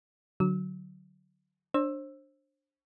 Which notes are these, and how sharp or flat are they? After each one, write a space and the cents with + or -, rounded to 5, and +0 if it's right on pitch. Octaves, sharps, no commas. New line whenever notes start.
D3 +0 F#3 +0 E6 -30
D4 +0 C5 +35 E6 +5